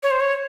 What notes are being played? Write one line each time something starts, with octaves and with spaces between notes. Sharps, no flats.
C#5
C5
C#5